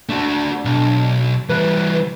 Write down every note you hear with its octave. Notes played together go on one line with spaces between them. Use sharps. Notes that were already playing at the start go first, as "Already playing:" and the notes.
A3 D4 F#4
B1
E3 G3 B4